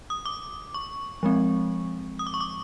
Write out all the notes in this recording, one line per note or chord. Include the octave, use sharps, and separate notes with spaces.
D#6
D6
C#6
F3 G#3 C4
D#6
D6
C#6
D6